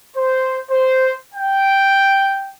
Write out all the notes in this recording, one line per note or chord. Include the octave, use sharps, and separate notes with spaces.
C5
C5
G5